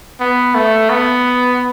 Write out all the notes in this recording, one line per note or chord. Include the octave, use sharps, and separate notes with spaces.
B3
A3
B3